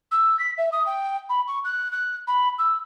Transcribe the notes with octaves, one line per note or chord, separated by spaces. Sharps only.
E6
B6
E5
D#6
G5
B5
C#6
F#6
F#6
B5
E6